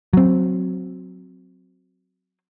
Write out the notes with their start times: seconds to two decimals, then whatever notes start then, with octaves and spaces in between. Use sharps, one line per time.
0.13 F#3 C4